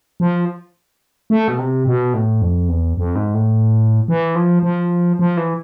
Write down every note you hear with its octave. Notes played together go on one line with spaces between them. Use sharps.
F3
A3
B2
C3
B2
A2
F2
E2
F2
G#2
A2
E3
F3
F3
F3
E3